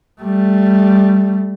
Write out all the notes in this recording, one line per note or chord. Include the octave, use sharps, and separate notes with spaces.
G3 A3